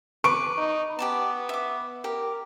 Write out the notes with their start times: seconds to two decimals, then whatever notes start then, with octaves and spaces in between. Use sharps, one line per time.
0.24 B4 C#6 D6 D7
0.58 D#4
0.99 B3 G4 D5 A5
1.49 E5 D6
2.04 G4 A#4